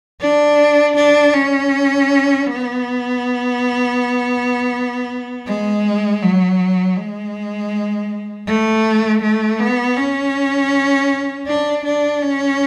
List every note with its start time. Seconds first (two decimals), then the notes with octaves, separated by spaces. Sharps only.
0.21 D4
0.96 D4
1.33 C#4
2.47 B3
5.47 G#3
6.22 F#3
6.96 G#3
8.47 A3
9.22 A3
9.60 B3
9.97 C#4
11.47 D4
11.84 D4
12.23 C#4